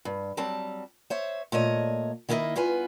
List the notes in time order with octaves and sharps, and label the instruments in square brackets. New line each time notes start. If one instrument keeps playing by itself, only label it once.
[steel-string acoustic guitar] G2
F#3 G3 C4 A5
C5 C#5 E5
A#2 A3 C#5 D#5
D#3 A#3 E4 G#4 D#5 E5
G2 B3 F4 B4 G#5